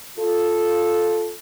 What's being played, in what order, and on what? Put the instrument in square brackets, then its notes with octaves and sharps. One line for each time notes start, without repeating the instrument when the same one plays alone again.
[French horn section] F4 A4